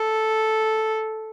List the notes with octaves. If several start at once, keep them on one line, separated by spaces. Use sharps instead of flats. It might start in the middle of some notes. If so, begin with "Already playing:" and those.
Already playing: A4